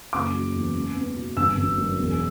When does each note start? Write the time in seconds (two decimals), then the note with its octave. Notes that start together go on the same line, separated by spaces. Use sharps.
0.13 F#1 D6
0.33 F#3
0.54 E2
0.75 C#2
0.96 B3
1.16 B2
1.36 G1 E6
1.57 G1
1.78 F#2
1.98 E1